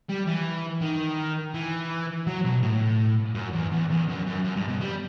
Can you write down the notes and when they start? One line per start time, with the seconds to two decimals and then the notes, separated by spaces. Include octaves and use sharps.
0.09 G3
0.27 E3
0.81 D#3
1.54 E3
2.27 F#3
2.45 B2
2.63 A2
3.35 F#2
3.53 E2
3.71 E2
3.90 E2
4.09 F#2
4.26 F#2
4.44 F#2
4.56 G2
4.69 B2
4.81 G3